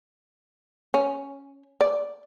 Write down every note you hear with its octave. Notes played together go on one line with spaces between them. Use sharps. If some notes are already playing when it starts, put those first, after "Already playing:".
C#4
D5